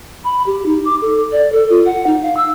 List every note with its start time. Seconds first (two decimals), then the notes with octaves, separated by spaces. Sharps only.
0.24 B5
0.46 G4
0.66 D#4
0.85 D6
1.02 A4
1.32 D5
1.52 A4
1.70 F4
1.85 F#5
2.06 D#4
2.22 F5
2.36 E6